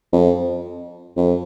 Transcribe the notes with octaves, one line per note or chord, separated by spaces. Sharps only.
F2
F2